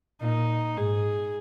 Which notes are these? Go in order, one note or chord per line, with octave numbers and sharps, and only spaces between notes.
A#2 D#4
G#2 G#4